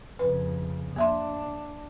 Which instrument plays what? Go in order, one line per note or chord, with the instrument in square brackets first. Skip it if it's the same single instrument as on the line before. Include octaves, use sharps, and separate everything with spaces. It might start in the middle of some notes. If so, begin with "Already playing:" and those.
[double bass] F2 C#3 [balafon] B4
[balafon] A#3 E5 C6 [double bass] D4